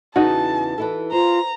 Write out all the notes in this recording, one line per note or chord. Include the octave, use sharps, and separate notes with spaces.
E2 C#3 E3 D#4 F#4 A5
E3 E4 A4
F4 C5 A#5